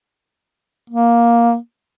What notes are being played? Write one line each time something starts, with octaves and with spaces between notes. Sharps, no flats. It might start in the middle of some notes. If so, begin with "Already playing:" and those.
A#3